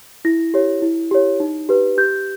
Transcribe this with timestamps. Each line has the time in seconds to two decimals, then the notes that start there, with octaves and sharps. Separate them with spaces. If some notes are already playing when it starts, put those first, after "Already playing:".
0.25 E4 A#6
0.54 G4 C#5
0.82 E4
1.11 G4 C#5
1.40 D#4
1.69 G4 B4
1.98 G4 G6